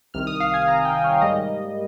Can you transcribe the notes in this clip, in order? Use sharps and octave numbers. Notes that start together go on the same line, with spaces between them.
C2 C3 D#3 F6
D#6
F5
G#5
A#5
G5
C#5
G#2 G3 A#3 D#5